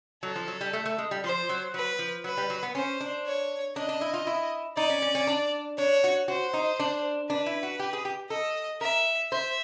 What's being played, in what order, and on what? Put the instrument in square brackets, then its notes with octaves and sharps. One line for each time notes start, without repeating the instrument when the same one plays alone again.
[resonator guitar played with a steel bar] F#3 [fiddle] A4
[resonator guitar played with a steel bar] F3
F#3
G3
A3
A3
G#3
G3
[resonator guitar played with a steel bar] F3 [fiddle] C5
[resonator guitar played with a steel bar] F#3
[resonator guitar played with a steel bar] F#3 [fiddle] B4
[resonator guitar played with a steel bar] F3
[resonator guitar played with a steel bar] F#3 [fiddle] B4
[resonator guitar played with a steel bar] G3
F#3
B3
[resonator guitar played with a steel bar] C#4 [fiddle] C5
[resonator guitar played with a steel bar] D4
[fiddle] C#5
[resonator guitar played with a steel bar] D4 [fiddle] D#5
[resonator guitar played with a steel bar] D4
E4
F4
E4
[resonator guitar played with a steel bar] D#4 [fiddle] D5
[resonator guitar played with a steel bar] C#4
C#4
C#4
D4
[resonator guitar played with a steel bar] D4 [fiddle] C#5
[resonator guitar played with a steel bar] F#4
[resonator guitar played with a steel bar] F#4 [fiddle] C5
[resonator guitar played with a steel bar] D#4
D4
[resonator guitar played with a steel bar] D4 [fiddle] B4
[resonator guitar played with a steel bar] E4
F#4
G4
G#4
G4
[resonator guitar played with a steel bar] A4 [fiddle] D#5
[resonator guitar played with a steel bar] A#4 [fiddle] E5
[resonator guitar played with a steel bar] C5 [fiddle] E5